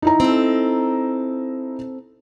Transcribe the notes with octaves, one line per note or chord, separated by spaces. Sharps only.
D#4 E4 A#5
C4 A4